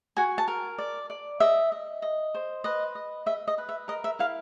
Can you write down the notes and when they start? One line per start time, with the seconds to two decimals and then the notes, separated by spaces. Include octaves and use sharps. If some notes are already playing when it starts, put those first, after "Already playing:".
0.17 F#4 G#5
0.38 A5
0.48 A#4
0.78 D5
1.10 D5
1.40 D#5 E5
1.72 D#5
2.02 D#5
2.34 C5
2.64 B4 D#5
2.95 D#5
3.26 D#5 E5
3.48 D#5
3.58 B4
3.69 E5
3.88 A#4 D#5
4.04 E5
4.19 E4 F5